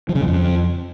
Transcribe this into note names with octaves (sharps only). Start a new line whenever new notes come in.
F3
C#3
F#2
F2